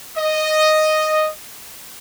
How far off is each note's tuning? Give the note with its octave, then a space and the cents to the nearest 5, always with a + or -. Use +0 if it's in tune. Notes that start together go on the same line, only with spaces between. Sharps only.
D#5 -5